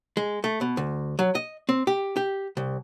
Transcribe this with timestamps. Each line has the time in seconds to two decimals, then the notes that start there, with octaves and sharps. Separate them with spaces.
0.17 G#3
0.44 A3
0.61 B2
0.77 D2
1.19 F#3
1.35 D#5
1.69 C4
1.87 G4
2.17 G4
2.57 C2